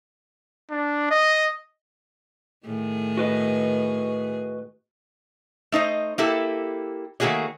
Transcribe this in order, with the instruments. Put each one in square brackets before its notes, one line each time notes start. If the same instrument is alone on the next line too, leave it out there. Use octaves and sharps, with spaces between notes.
[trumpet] D4
D#5
[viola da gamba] A2 D#3 G#4
[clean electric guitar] F#4 B4 D#5
[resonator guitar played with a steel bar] A3 D#4 C5 D#5
A#3 E4 G4 A4
D#3 A3 A#3 F#4 G#4 C#5